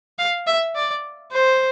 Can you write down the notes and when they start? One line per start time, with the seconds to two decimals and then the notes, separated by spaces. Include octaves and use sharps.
0.19 F5
0.47 E5
0.75 D5
1.32 C5